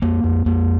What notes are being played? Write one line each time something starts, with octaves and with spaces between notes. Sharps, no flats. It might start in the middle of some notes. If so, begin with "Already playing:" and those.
F2 A#3
F2
F2 A#3